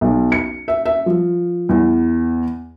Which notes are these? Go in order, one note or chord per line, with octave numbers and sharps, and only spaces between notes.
B1
C#7
E5
E5
F3
E2